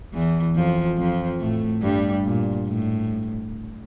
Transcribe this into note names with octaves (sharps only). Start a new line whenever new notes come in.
E2 E3
F2 F3
F2 F3
A2 A3
G2 G3
A#2
A2